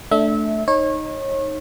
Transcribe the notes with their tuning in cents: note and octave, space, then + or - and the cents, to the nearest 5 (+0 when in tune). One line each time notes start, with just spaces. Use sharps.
A3 +0 D4 +0 E5 -25
D#4 -5 C#5 -30